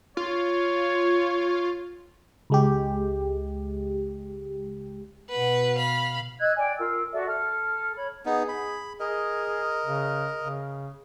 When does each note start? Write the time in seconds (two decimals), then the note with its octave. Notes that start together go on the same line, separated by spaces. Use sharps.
0.17 F4 C#5
2.50 C#2 G#3 G4
5.30 B2 B4 F#5
5.75 F5 B5
6.39 D#5 E6 F#6 G#6
6.56 D5 G5 G#5
6.77 F4 A#4 E6
7.12 F#4 A4 D5 E5
7.27 A4 F6
7.95 C#5 B5
8.26 B3 D#4 G#4
8.48 B5
9.00 G#4 A#4 D#5
9.86 C#3
10.40 C#3